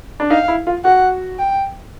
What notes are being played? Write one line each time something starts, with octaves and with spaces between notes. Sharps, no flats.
D4
D#4 F5
E4
F4
F#4 F#5
G5